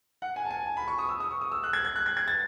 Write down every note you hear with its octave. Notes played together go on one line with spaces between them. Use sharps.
F#5
G#5
A5
G#5
A5
B5
C#6
D#6
E6
D#6
C#6
D#6
E6
F#6
G#6
G#6
F#6
G#6
G#6
A6